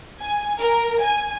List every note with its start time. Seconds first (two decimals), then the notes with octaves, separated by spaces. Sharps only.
0.20 G#5
0.59 A#4
1.02 G#5